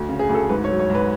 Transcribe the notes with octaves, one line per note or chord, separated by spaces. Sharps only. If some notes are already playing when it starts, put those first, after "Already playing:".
Already playing: D2
C#3
G#4
D2
A4
G#2 B4
C#5
F#3
C#5
G#2
B4